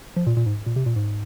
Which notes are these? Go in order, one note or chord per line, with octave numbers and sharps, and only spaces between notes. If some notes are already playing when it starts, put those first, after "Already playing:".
F3
A#2
A#2
G#2
A#2
C3
A#2
G#2